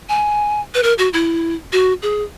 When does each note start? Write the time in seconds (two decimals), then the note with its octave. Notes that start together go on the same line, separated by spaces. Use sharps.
0.09 G#5
0.74 B4
0.83 A#4
0.98 F#4
1.13 E4
1.72 F#4
2.02 G#4